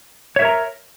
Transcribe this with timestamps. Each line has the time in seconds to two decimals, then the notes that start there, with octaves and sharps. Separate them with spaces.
0.36 C#5
0.39 E5
0.42 A#4
0.45 A#5